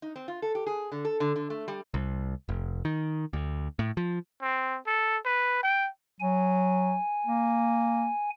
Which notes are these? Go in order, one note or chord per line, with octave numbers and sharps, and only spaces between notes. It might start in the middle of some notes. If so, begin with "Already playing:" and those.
D#4
C4
F4
A4
G4
G#4
D3
A4
D3
D3
A3
G3
C2
F1
D#3
D2
A2
F3
C4
A4
B4
G5
F#3 G#5
A#3